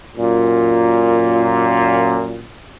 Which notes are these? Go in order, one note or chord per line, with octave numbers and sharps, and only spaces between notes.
F#2 A#2